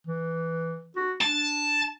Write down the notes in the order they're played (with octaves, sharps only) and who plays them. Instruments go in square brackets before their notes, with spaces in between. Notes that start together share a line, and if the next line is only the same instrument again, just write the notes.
[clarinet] E3
F#4
[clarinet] D4 [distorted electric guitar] A5